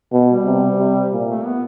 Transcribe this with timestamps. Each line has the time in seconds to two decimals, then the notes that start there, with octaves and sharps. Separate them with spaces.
0.12 B2
0.29 G3
0.45 C3
0.78 C3
1.12 A#2
1.28 A3
1.45 B3